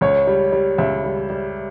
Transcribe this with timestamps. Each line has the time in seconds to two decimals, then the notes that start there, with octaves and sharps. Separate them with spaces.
0.01 C#2 C#5
0.27 G3
0.52 G3
0.78 C#2 E5
1.04 G3
1.30 G3